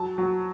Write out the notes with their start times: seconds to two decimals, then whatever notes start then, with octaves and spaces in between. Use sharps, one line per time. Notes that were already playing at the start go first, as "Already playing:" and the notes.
Already playing: F#3 A5
0.18 F#3